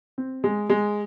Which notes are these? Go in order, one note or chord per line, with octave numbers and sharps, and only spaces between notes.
C4
G#3
G#3